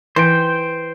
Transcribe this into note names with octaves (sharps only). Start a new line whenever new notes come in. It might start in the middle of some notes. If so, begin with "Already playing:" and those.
E3 C5 G5